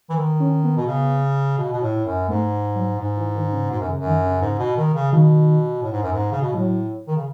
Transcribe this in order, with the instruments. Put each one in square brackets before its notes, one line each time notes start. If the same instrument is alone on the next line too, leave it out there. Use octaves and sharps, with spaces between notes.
[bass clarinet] E3
D#3
[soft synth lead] C#4
B3
[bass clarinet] B2
C#3
B2
B2
A2
F#2
[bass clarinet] G#2 [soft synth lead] A3
[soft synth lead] F#3
[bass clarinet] G#2
[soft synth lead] E3
D#3
C#3
[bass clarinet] G#2 [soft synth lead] B2
[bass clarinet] F#2
[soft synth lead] C#3
[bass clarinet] F#2
[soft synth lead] D#3
C#3
[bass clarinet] G#2
B2
D#3
C#3
[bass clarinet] B2 [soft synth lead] D#3
[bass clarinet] A2
G#2
F#2
G#2
C#3
B2
[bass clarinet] A2 [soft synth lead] F#3
[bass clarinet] D#3
C#3